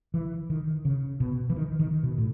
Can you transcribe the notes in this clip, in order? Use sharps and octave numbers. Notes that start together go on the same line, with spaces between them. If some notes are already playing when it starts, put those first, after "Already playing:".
E3
D#3
C#3
B2
E3
D#3
D#3
B2
A2